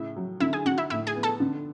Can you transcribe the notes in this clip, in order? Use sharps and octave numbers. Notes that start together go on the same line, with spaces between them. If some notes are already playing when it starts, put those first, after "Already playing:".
Already playing: A2 C#3 E4 E5
F#3
D3 E4 E5
G#4 G#5
D3 F#4 F#5
E4 E5
A2 E4 E5
G#4 G#5
B3
A4 A5
D3